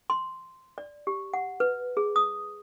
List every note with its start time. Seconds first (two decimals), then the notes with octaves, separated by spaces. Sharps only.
0.10 C6
0.78 D5
1.07 G4
1.33 F#5
1.60 B4
1.97 G#4
2.16 D#6